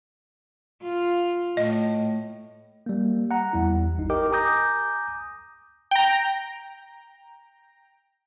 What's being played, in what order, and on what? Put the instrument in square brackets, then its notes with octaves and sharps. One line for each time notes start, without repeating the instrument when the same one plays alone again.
[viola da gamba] F4
[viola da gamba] A2 [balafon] D#5
[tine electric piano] G3 A#3
F#5 A#5
E2 G3 E4
G#1 D#4
G4 A#4 D#5 G5 D6
G#5 A#5 D6 D#6 G6 A#6
[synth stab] G5 A#5